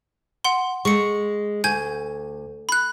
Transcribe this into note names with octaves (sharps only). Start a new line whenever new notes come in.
F#5 C6
G#3 C#6 C#7
D2 G#5 G6 G#6
B5 F#6